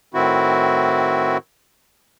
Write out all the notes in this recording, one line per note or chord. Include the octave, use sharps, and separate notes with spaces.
A2 D#3 C4 E4 F#4